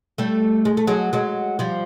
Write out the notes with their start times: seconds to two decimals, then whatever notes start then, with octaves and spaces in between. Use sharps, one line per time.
0.18 G3 A3
0.65 G#3
0.77 A3
0.87 F#3 G#3
1.13 F#3 G#3
1.59 F3 G3